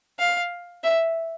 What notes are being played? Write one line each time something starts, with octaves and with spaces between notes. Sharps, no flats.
F5
E5